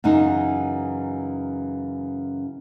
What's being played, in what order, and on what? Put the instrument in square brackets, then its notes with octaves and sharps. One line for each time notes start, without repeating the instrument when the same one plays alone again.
[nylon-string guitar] F#2 C#3 E3 D#4